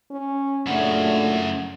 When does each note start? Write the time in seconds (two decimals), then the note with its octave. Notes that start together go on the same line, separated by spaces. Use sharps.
0.10 C#4
0.67 F#2 A#2 C#3 F#3 A3 D4 E5 F#5